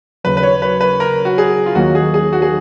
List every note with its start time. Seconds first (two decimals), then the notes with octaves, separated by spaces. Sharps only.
0.24 D#2 C#3 F#3 B4
0.37 B4
0.43 C#5
0.62 B4
0.81 B4
1.00 A#4
1.25 F#4
1.38 G#4
1.66 F4
1.75 D#2 D#3 F#3 A#3 F#4
1.95 G#4
2.14 G#4
2.33 F#4
2.42 G#4